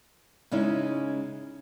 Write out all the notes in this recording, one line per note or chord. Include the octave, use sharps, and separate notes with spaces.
C#3 G#3 C#4 D#4 E4